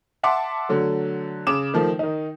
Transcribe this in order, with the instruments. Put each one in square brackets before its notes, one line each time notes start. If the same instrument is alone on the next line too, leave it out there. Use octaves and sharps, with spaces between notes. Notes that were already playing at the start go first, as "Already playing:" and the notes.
[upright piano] E5 F#5 A5 C6 D6
D3 F#3 A3
C#3 D6 E7
D#3 F3 A3
D#3 D#4